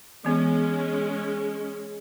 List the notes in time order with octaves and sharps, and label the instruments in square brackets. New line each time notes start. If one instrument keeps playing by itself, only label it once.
[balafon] E3 B3 [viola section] G#3 C#4